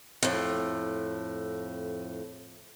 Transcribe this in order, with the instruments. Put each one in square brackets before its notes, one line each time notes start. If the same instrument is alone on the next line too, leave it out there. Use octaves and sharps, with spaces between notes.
[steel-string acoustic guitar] F2 A2